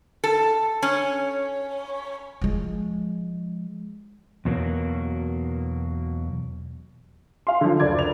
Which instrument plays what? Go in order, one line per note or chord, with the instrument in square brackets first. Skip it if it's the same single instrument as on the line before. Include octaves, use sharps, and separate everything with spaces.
[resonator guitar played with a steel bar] A4
C#4
[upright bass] F3 G#3
[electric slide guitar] E2 B2 F#3 A#3
[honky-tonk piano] F5 C6
D3 F3
F#1 D2 D5 G#6
F7